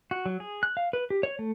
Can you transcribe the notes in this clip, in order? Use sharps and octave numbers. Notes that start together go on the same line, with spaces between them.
F#4
F#3
G#4
F#6
F5
B4
G4
C#5
A3